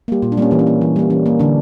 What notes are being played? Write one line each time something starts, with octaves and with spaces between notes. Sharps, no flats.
G3 A#3 G4
A#2 F4
D4
G3 A#3 C#4
E3 A#3
C#4
A#3
E3
G3 A#3
E3 C#4
A#3
D3 D4